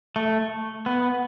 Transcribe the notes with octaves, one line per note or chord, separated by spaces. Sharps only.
A3
B3